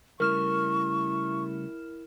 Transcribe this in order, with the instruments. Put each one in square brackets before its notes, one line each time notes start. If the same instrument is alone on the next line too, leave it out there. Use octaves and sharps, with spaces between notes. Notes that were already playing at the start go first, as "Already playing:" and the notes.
[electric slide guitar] C#3 G3 A3 [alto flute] E4 [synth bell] A#4 F6 E7 [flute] C#6